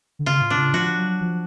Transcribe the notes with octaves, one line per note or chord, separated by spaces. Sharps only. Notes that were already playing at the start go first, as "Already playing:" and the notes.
D3
C#3 F4
A2
D4
C#3
F3 F#4
F#3
F3